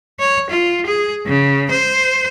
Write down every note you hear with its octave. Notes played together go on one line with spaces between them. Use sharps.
C#5
F4
G#4
C#3
C5